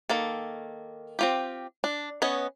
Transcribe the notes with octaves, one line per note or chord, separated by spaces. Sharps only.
D#3 A#3 A4
C4 F4 G4
D4
B3 C#4 C#5 D#5